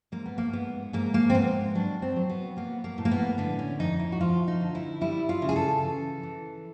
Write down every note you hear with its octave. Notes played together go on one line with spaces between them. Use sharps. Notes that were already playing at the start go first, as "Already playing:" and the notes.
G#2 A#3
B3
A#3
G#2 B3
G#2 A#3
A#3
C4
G#2 B3
F#3 D4
C4
F#3
B3
A#3 B3
A#3
A2
A#3
B3
D3 B3
C#4
F2 D#4
E4
F#4
F3 F4
D#4
D3
E4
G3 E4
F4
C#3
G#4
A4
E3
E3